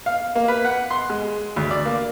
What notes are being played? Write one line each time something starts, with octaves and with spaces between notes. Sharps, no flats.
F5
A#3
B4
F#5
C6
G#3
D2
D5
A#3